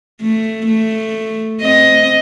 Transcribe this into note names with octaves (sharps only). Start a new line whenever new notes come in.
A3
A3
C4 D#5